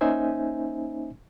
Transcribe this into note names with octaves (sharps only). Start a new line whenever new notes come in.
A#3 C#4 D#4 C5 E5 G#5